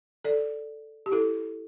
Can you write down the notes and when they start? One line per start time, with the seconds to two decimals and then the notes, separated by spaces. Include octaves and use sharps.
0.25 A4 D5
1.06 G4
1.12 E4 A4